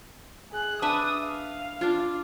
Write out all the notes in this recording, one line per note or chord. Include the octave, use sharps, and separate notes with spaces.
G#4 F#6
D4 B4 E5 D#6
F5
D4 F4